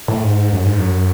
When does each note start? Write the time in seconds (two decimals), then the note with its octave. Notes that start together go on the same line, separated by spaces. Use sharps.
0.08 A2
0.23 G#2
0.53 F#2
0.65 G#2
0.79 F#2